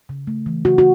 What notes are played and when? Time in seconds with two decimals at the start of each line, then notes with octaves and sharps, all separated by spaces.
0.09 C#3
0.27 A3
0.46 E3
0.65 C#3 F#4
0.78 F#4